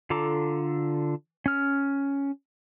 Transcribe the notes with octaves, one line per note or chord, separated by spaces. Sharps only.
D3 F4 A4 A#5 D6
C#4 F6